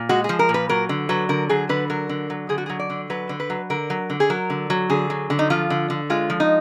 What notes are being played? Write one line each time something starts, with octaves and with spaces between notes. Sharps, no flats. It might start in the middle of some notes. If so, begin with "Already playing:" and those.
Already playing: A#2
G#3 F#4
F3 G#4
A#4
A#2
B4
F#3 A#4
D3
F#3 B4
D3 A#4
F#3 G#4
D3 B4
F#3 A#4
D3
F#3
D3 G#4
F#4
F#3 G#4
D5
D3
F#3 B4
D3
B4
F#3
D3 A#4
F#3
D3
G#4
F#3 A#4
D3
F#3
D3 G#4
F#3
D3
D#4
F3 F4
D3
D3
G#3 F4
F3
D#4